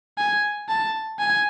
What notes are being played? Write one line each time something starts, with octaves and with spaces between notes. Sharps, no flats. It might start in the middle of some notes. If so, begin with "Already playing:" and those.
G#5
A5
G#5